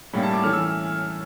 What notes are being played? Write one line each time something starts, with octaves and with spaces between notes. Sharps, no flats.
A2 G3 A#3 C#4
A5
D6
E3 A3 C#4 F6
E6